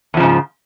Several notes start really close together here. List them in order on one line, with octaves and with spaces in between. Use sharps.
E2 F3 C#3 G#2